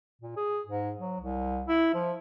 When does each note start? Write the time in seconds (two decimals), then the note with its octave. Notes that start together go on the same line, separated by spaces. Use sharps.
0.21 A#2
0.37 G#4
0.67 G#2
0.99 F#3
1.21 C2
1.68 E4
1.94 F3